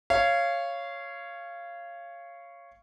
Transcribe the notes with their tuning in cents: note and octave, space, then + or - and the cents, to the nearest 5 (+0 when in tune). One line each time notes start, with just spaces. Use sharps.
C#5 +0 F5 -20